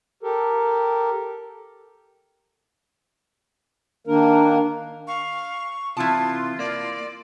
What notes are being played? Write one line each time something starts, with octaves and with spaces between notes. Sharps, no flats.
G4 A4 A#4
D#3 A#3 D4 A#4
F5 C#6
C3 E3 E4 F4 A5 D#6
A#3 D5